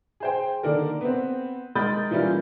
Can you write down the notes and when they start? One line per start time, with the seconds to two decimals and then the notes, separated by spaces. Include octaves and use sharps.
0.20 G#4 C5 G5
0.63 D3 D#3 A#3 D4 A4 A#4
1.01 B3 C4
1.75 G#3 A#4 B5 D#6 G6 A6
2.11 E3 G3 A#3 C#4 F4